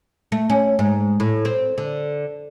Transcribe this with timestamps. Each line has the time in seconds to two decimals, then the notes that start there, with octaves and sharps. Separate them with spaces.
0.32 A3
0.50 C#4
0.79 G#2
1.20 A2
1.45 C4
1.78 D3